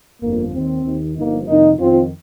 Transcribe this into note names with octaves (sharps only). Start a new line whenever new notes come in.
G1 F2 F3 A#3
D#2 D#3 C4
D#2 D#3
G1 G2 F3 A#3 D#4
F2 C3 D#3 A#3 D#4
F2 D#3 C4 F4